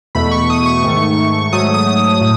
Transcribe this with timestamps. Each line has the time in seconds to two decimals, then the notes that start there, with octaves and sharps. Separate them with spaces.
0.15 E2 B2 A3 B5
0.31 C#6
0.50 D#6
0.66 C#6
0.83 G#2 D#3 A3
1.52 G#2 F#3 A3 D#6
1.74 D#6
2.21 A2